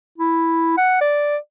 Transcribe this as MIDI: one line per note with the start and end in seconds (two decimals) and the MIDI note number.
0.18 0.74 64
0.78 0.97 78
1.01 1.37 74